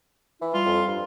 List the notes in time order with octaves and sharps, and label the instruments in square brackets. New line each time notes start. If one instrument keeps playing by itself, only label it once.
[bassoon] E3 [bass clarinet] E4
[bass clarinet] G3 [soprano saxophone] F4
[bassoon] F2
G2